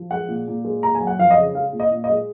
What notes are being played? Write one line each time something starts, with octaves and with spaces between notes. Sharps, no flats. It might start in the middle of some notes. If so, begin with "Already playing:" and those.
Already playing: F3
G#3 F#5
A#2
A#2
G#3
A#3 A#5
G#5
F#3
F#5
F2 F5
D#5
C#3
G#3 F5
A#2
D#5
A#2
D#5
G#3